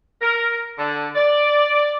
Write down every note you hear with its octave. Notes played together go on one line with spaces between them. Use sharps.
A#4
D3
D5